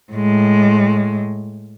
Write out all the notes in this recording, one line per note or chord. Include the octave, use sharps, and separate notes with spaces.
A2 G#3